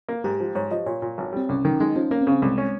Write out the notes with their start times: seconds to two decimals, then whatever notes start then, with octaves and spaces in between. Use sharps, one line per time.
0.08 A#3
0.24 G#2 G4
0.40 F3
0.55 G#2 C#5
0.71 F3 D#5
0.86 A#2 C#5
1.02 A#2
1.18 G#1
1.33 G3 C4
1.49 C2 C#4
1.65 D#3 D#4
1.80 G#3 D#4
1.96 F3 C#4
2.11 A#3 C#4
2.21 C4
2.27 C#3
2.32 C4
2.42 C2 G#3
2.58 C#4